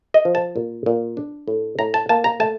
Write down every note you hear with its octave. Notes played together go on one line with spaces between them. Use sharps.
D#5
F3
A5
A#2
A#2
D4
A2
A2 A#5
A5
A#3 A5
A#5
A3 A5